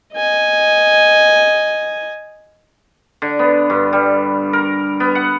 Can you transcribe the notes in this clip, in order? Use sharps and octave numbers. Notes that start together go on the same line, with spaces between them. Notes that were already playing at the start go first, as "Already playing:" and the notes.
D#5 G#5
D3
B3
G2
G3
A#4
B3
F#5